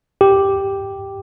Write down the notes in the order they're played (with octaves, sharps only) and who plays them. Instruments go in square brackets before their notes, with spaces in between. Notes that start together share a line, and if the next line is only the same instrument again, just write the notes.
[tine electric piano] G4